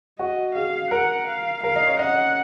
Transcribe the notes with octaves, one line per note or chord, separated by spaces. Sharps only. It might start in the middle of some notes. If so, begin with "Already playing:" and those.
F#4 D#5
G#4 F5
A#4 F#5
F5
A#4 F5
D#5
C#5
D#5 F#5